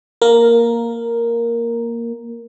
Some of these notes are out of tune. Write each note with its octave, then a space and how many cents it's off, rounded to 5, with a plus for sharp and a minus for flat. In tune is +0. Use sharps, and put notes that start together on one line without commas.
A#3 +0 A#4 +0